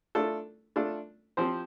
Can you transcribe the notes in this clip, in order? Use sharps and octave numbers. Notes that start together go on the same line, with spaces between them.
A3 D4 F4 A4
A3 D4 F4 A4
F3 C4 G4 C5